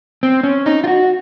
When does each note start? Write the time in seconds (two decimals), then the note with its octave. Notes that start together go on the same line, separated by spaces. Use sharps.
0.23 C4
0.44 C#4
0.66 D#4
0.84 F4
0.88 F#4